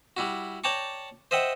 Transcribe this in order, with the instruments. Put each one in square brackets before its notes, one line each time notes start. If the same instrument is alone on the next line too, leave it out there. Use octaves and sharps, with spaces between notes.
[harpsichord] G3 E4 F#4
C#5 D5 G5 A5 A#5 C#6
C5 D#5 E5 F#5 G5